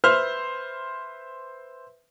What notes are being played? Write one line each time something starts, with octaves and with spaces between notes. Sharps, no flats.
B4 C5 E5 F6